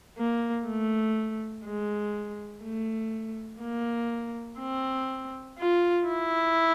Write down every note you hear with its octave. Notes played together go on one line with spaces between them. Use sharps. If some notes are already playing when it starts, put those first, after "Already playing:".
A#3
A3
G#3
A3
A#3
C4
F4
E4